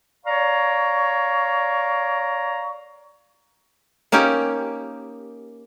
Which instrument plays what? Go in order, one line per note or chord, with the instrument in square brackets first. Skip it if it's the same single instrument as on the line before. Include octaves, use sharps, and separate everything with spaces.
[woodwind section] C#5 D5 F5 A#5 C#6
[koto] A#3 C#4 D#4 G4